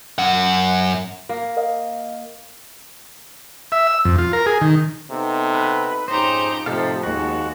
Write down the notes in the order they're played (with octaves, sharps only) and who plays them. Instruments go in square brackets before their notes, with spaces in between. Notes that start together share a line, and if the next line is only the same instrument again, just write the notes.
[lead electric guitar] F#2 F#5
[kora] A#3
[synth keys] A#4 D#5 F5
[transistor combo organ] E5
E6
F2
F4
A#4
G#4
D#3
[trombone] C3 [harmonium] B3 D#4 A4
[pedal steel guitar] B4
[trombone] F2 [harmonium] G#2 C#4 [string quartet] D#4 G4 A#5 [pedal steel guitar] C5
[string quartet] A2 F3 [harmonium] C3 D#4 [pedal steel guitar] G4 A4 F5
[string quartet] D#2 [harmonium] G#3 A#3 [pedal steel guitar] F#4